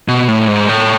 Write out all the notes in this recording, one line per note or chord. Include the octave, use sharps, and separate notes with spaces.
B2
A2
G#2
A2